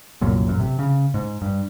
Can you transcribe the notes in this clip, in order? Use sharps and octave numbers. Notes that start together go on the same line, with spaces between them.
C2 F#2 A#2
A1 F#2
C3
C#3
G#2
G2